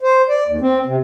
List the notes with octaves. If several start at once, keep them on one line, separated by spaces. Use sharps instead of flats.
C5
D5
D#2
C4
C3